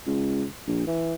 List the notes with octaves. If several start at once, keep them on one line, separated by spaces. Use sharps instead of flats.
C#2
A#1
E3